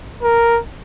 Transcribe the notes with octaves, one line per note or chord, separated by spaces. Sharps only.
A#4